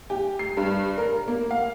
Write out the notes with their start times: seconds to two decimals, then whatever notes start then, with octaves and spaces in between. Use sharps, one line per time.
0.10 G4
0.39 C7
0.57 G2
0.98 A#4
1.28 A#3
1.51 F5